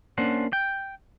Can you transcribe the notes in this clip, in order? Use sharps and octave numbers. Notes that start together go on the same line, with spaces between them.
A#3 C#4 D4 C5 F#5
G5